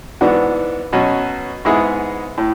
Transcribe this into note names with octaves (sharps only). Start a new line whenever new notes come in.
G#2 E3 B3 D4 F#4
B2 F#3 C#4
G#2 G#3 B3 E4 G#4
A2